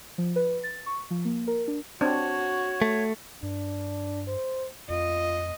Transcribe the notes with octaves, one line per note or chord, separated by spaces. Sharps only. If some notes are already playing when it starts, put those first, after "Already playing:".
F3
B4
A6
C#6
F3
A#3
A#4
D4
C4 D4 F#4 C#5
A3
G2 D4
C5
F2 F4 D#5